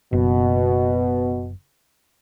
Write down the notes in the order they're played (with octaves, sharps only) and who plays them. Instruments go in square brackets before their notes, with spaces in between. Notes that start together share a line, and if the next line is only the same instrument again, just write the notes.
[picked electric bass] F#1 [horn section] B2